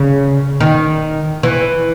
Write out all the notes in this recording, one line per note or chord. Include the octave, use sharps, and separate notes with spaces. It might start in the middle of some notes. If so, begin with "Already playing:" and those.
Already playing: C#3
D#3
E3